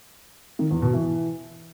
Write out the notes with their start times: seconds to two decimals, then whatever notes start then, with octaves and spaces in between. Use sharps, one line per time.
0.59 D#3
0.71 E2
0.82 B2
0.94 E3